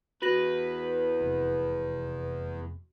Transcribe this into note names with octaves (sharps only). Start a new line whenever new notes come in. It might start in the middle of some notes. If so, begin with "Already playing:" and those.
E2 F#4 B4 A#6 F#7
F1